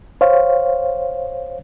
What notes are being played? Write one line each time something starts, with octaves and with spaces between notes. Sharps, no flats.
C5 C#5 F5